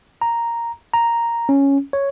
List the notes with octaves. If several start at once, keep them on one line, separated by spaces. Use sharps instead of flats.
A#5
A#5
C#4
C#5